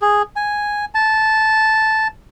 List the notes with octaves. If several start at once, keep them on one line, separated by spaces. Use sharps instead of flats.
G#4
G#5
A5